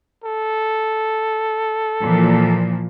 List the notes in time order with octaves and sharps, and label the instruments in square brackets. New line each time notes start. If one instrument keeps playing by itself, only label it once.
[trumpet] A4
[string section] A#2 E3 F3